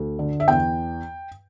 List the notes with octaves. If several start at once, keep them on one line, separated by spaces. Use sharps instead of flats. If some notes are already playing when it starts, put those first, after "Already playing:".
Already playing: D2
D3
E5
E2 G5